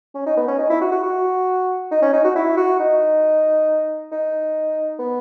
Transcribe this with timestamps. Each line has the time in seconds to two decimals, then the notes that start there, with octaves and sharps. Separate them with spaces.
0.15 C#4
0.27 D#4
0.37 B3
0.48 C#4
0.59 D#4
0.70 E4
0.81 F#4
0.92 F#4
1.03 F#4
1.91 D#4
2.02 C#4
2.13 D#4
2.24 F#4
2.36 E4
2.57 F#4
2.80 D#4
4.12 D#4
4.99 B3